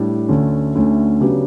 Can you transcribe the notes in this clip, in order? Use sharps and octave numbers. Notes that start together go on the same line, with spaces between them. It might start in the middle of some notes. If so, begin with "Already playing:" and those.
Already playing: A2 G3 D4
D2 D3 A3 C#4
D2 D3 A3 C#4
C#3 F#3 B3 D4 G4